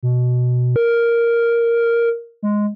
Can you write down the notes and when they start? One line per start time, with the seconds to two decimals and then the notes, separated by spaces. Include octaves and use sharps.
0.03 B2
0.76 A#4
2.43 G#3